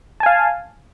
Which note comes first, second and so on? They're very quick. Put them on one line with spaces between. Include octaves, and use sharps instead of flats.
A5 G#5 F5